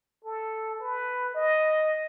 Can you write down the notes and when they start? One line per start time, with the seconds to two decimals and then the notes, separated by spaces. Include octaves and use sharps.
0.24 A4
0.80 B4
1.34 D#5